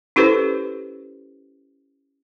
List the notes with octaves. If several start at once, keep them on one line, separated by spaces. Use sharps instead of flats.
C#4 E4 G4 A4 B4 C5